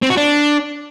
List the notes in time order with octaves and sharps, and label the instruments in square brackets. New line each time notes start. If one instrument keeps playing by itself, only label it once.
[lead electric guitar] C4
F#4
D4